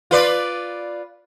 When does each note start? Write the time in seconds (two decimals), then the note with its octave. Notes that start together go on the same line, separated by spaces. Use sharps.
0.11 F4 B4 D5